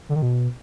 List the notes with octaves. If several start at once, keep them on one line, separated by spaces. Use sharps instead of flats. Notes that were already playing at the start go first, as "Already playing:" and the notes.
D3
D#3
B2